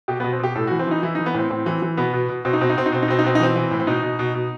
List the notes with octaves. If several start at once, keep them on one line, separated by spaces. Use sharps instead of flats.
B2 G4
B3
B2
C4
B2 G4
A2 A4
F#4
E3
C4
E3 D#4
E3 E4
D#4
E3
B3
A2 C4
A2 C4
E3
E3
B2 B3
B2
B2
B2 C4
D#4
B2 C4
D#4
B2 C4
D#4
B2 C4
D#4
B2 C4
D#4
B2 C4
D#4
E3 C4
E3
A2
C4
B2 D#4
B2
B2
B2